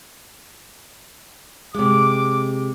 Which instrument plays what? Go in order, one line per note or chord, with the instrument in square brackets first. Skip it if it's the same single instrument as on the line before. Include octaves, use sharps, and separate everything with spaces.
[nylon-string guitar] C3 G#3 [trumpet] D6